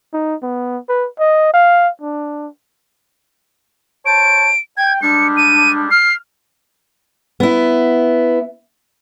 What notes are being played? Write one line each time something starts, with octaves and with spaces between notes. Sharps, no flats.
D#4
B3
B4
D#5
F5
D4
C5 C#5 A5 D7
G5 G#6
G3 G#3 D4 C#7
D#7
F6 C7
B3 E4